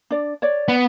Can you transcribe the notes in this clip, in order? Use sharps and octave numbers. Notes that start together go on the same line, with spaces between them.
D4 D5
C#5 D5
B3